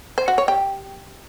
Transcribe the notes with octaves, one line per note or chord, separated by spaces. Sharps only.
C5
F#4
C#5
G4